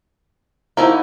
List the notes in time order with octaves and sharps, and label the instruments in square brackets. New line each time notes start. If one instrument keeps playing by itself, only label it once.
[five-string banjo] F3 A#3 [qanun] D#4 E4 F#4